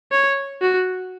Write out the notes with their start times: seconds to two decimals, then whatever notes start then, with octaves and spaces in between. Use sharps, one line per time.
0.12 C#5
0.61 F#4